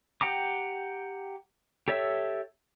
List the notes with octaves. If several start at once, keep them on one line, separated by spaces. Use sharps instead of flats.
G4 F#5 G5 A#5 D6
G4 A4 C#5 E5